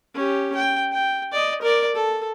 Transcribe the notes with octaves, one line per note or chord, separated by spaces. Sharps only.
C#4 G4
G5
G5
D5 D#5
A#4 D5
A4